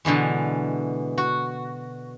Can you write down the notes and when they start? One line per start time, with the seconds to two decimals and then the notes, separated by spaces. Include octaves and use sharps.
0.05 B2 D3 E3 G#3
1.18 F#4